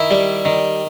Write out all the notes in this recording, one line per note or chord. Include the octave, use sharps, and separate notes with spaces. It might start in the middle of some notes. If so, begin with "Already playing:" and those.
Already playing: D#3 E4
G3
D#3